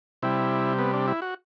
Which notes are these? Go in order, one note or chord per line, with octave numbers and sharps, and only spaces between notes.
C3 G3 E4
B3
D4
E4
F#4